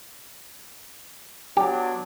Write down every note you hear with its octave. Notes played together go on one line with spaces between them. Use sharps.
F#3 B3 D4 G4